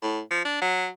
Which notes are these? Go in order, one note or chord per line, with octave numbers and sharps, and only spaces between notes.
A2
F3
D4
F#3